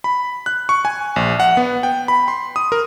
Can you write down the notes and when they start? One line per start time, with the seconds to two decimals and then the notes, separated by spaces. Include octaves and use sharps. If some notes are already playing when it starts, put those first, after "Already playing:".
0.04 B5
0.46 F#6
0.69 C#6
0.85 G#5
1.16 A#1
1.40 F#5
1.57 B3
1.83 G5
2.08 B5
2.28 C6
2.56 D#6
2.72 A#4